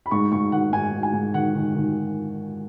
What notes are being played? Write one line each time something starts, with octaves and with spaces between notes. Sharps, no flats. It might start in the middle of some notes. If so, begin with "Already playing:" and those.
B5
G#2 C#6
G#2 C#6
D#3 F#5
G#2 G#5
G#2
G#5
G#2
D#3 F#5
D#3
D#3